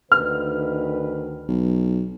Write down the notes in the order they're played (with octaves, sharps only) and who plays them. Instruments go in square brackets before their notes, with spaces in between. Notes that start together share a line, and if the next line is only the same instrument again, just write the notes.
[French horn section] D2 D#3 B4 [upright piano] F6
[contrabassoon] B1